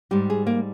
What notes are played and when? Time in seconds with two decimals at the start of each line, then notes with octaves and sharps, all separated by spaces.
0.11 G#2 G3 G4
0.30 G#4
0.47 A#3